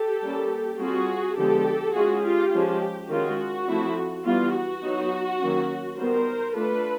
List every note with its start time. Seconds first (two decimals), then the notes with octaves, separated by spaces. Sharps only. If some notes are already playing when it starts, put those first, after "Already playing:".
Already playing: G4 A4
0.22 G3 A#3 C#4
0.79 G3 C4 F4 F#4 G#4
1.37 D3 F3 G#3 B3 G4 A4
1.94 G#3 C#4 F4 F#4 G#4
2.24 F4 G4
2.52 F3 G#3 C#4 F4
3.09 D#3 G#3 C#4 F4 F#4
3.68 F3 A3 C4 E4
4.25 E3 G3 B3 F4
4.54 F#4
4.82 F#3 B3 D#4
5.40 D#3 F#3 A#3 C#4
5.98 D#3 G3 B3 A#4 C5
6.56 A3 D4 F4 A4 B4